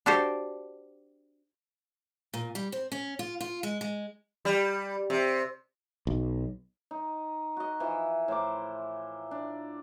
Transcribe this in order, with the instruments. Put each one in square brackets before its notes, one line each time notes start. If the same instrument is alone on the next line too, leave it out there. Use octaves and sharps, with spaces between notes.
[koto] D4 F#4 G4 A4 C5
[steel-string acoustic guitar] A#2
G3
C4
C#4
F4
F4
G#3
G#3
[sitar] G3
C3
[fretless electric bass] B1
[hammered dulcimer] D#4
F#4 D#5
E3 F3
A2 C5 A#5 D6
D4